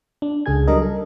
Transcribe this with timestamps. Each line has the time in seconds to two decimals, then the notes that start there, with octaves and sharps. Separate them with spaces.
0.22 D4
0.46 C#2 C#3 G#4 A4 G#5 G#6
0.67 F#3 G3 D4 A#4 D#5
0.82 A4